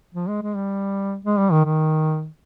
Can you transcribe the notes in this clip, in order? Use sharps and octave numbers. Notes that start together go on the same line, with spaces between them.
F3
G#3
G#3
G3
G#3
G3
D#3
D#3